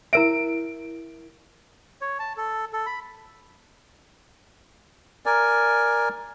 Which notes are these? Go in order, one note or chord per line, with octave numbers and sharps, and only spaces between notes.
E4 A#4 E5 D7
C#5
A5
A4
A4
B5
A#4 D5 G#5